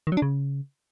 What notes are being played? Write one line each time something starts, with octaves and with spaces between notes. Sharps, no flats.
D#3
F#3
D4
C#3